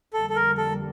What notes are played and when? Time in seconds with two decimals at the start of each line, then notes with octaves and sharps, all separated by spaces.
0.13 F2 D3 G3 A#3 A4
0.30 A4
0.36 A#4
0.58 A4